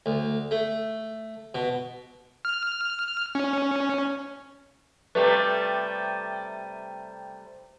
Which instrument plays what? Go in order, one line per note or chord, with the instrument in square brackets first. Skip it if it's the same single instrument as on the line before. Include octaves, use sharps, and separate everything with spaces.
[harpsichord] D2
A3
B2
[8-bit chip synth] F6
C#4
[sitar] C3 G3 A3 [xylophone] B4